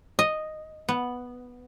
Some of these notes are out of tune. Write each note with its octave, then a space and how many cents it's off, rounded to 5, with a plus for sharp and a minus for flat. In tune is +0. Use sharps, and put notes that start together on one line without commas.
D#5 -5
B3 -5